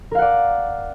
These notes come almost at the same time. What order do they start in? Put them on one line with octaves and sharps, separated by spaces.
A#4 F5 F#5 D5